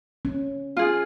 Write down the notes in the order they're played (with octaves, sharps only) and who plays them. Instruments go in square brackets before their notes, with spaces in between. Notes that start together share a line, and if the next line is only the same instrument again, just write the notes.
[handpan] C#4
[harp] F4 G#4